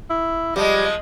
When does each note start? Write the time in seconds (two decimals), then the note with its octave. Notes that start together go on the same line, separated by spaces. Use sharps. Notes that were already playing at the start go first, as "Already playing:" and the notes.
0.10 E4
0.56 F3 G3 G#3 D#5